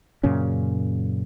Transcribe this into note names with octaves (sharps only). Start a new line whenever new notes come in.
F#2 A#2 C#3 C#4